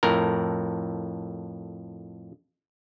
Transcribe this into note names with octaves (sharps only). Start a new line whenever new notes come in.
F2 A2 A#4